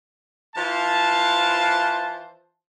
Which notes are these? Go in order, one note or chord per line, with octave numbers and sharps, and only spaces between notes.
E3 F4 C5 A5